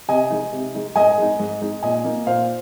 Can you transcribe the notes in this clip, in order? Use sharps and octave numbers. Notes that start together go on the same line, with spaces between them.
C3 D#5 G#5
G#3 D#4
C3
G#3 D#4
G#2 D#5 G#5
G#3 D#4
G#2
G#3 D#4
A#2 D#5 G#5
A#3 D#4
A#2 C5 F5